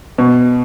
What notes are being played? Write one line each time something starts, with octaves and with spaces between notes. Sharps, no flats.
B2